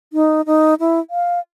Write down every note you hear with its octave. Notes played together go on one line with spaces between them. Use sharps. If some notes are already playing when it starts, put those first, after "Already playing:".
D#4
D#4
E4
F5